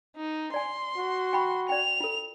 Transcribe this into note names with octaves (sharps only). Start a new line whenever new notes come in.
D#4
D5 G#5 C6
F#4
G5 B5 C#6
D5 G5 F7
F4 A4